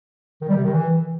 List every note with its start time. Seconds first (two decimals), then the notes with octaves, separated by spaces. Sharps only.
0.41 D#3
0.49 G3
0.57 C3
0.64 D#3
0.72 E3